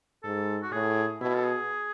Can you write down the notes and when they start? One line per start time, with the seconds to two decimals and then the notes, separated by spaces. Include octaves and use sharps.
0.23 G#2 A4
0.63 F#4
0.72 A2 G#4
1.21 B2 E4
1.35 A4
1.44 G#4